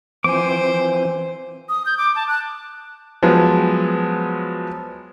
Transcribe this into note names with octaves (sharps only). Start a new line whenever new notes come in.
E3 F3 C4 C5 G#5 D6
D#6
G6
D6
A5
F#6
F3 F#3 G#3 B3